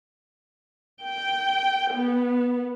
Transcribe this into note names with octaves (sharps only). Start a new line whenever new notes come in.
G5
B3